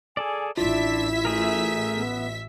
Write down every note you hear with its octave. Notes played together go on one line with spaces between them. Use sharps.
G#4 A4 D5 G#5
A1 D4 E4 F4 E5 B6
A3 G#4 A#4
B3